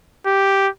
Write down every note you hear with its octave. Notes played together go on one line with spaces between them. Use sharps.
G4